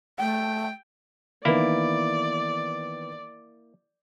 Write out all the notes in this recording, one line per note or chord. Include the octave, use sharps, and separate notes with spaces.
A3 G5
D#3 E3 A#3 B3 E4 D5